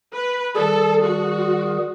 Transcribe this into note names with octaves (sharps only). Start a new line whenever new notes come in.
B4
D#3 G3 G#4 A4
F#4